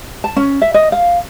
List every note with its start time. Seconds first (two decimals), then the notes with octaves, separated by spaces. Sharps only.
0.24 A5
0.36 C#4
0.62 E5
0.74 D#5
0.92 F5